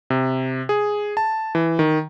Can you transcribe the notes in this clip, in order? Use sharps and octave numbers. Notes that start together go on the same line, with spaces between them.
C3
G#4
A5
E3
D#3